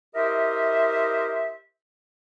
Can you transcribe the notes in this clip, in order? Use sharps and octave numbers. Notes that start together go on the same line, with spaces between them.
E4 G4 A#4 C5 D#5 E5